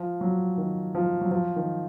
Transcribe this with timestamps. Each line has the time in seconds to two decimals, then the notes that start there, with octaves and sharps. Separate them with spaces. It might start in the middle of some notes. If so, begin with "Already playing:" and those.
Already playing: F3
0.21 F#3
0.58 D#3
0.95 F3
1.21 F#3
1.31 F3
1.56 D#3